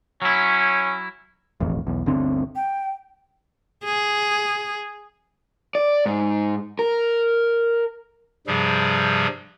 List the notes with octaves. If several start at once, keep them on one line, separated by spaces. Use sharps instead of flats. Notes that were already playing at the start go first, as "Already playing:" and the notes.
F#3 C#4 E4
E1 A1 F2
B1 E2
G1 D2 D3 C4
G5
G#4
D5
G#2
A#4
G2 C3 F3 G3 G#4